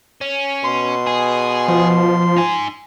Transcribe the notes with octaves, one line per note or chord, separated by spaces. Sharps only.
C#4
B2 C6
G#4
F3 C6
D#4 G#5